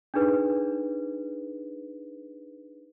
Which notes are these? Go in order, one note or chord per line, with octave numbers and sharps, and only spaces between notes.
D4 D#4 G#4 B4